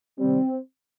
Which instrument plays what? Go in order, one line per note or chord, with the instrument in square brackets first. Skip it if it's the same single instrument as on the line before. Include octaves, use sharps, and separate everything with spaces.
[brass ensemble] C3 D#3 G3 C4